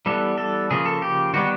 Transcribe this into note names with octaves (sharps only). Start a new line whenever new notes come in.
E3 G3 B3 A4
A4
C#3 F3 A#3 G#4
A4
G4
D#3 G3 B3 F#4